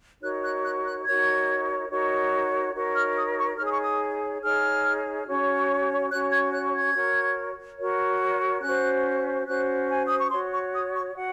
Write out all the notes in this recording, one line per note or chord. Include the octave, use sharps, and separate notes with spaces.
D#4 F#4 A#4 C#5 F#6
F#6
F#6
F#6
D#4 F#4 A#4 C#5 G#6
D#4 F#4 A#4 C#5
D#4 F#4 A#4 C#5
F6
D#6
C#6
D#4 G#4 C#5 F6
D#6
C#6
D#6
D#4 G#4 C#5 F6
C#4 F#4 C#5
C#4 F#4 C#5 F#6
G#6
F#6
G#6
F#4 A#4 C#5
F#4 A#4 C#5
C#4 F#4 C5 F#6
C#4 F#4 C5 F#6
G#5
D#6
C#6
F#4 C#5 C6
C#6
D#6
C#6
F#4 F#5